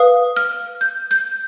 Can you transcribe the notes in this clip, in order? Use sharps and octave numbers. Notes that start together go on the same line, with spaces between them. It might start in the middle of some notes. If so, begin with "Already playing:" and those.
Already playing: B4 F5 D#6
F6
G6
G6